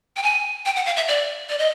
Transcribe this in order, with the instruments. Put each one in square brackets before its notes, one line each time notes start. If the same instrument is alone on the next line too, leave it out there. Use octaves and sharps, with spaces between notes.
[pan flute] G5
G#5
G5
F#5
F5
E5
D5
D5
D#5